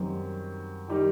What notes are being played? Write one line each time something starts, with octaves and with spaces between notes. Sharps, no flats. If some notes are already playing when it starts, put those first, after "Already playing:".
Already playing: F#2 D#3 G3 C4 D#4
D#3 G3 D#4 G4